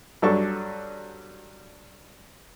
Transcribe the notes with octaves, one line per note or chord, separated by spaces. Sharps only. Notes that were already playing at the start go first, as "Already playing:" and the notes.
G2 F#3 D4 A4 C#6